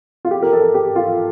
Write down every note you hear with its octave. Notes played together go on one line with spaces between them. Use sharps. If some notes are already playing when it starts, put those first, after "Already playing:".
F4
G4
A#4
A4
G4
F4